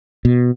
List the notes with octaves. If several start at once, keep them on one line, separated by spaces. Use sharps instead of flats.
B2